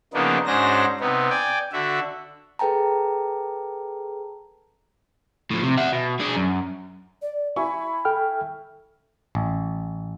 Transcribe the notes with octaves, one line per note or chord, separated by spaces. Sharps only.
C#3 F3 A#3 B3 D4 D#4
G#2 C#4 D4 F#4 C5 A#6
C3 B3 D#4
D5 G5 G#5
D3 F#4 E5
G#4 A4 B4 G5 A5 A#5
A2 F3
C3
E5 F#5
B2
D4 G#4
F#2
D5
E4 G#5 B5 C#6
A4 G5 F6
A1